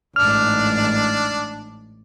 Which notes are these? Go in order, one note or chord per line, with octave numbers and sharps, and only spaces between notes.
A1 G#2 D4 F6